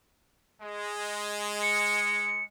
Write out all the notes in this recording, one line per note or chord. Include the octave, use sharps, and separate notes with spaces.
G#3
C#7